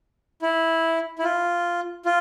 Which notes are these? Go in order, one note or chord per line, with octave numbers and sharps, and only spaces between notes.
E4
E4
F4
F4